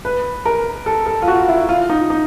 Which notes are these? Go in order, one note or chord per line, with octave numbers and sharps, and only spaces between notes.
B4
A#4
A4
A4
F4
F#4
E4
F4
D#4
D#4